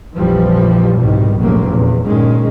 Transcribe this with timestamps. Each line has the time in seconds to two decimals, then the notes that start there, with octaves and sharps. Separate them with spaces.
0.16 A#1 F2 E3 F3 G3
0.98 C2 G#2 B2 D#3 G3
1.38 F1 B1 A2 C#3 F#3 A#3
1.69 E2 A#2
2.07 G1 G2 A#2 D#3 G#3 C#4